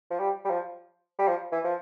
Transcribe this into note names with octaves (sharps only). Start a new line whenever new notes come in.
F3
G3
G3
F3
G3
F3
E3
F3